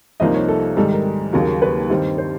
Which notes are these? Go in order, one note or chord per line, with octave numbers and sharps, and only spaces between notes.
C2 C3 F3 A#3 D#4 D#5
C#5
A4
G#2 D#3 G3 A4
A#4
D#2 C#3 F#3 A#3
B4
G2 D#3 G3 C4
C5